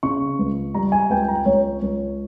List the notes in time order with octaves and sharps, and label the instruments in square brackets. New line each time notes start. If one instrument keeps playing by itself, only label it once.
[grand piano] C#3 C#6
C#2
G3 A#5
G#5
C#2 G5
A#5
C#2 C#5
C#2